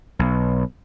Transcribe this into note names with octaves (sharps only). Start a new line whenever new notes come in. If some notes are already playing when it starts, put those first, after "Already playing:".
B1